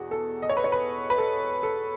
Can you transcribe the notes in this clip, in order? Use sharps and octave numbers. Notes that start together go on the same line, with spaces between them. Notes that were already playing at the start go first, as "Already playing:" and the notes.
Already playing: E2 B2 F#4 G#4
A4
D#5
C#5
B4
C#5
B4
B4
A4
A4